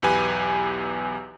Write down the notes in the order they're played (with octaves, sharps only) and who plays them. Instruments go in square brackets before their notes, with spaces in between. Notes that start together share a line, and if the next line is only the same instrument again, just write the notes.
[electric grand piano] B1 E2 G4 B4 G#5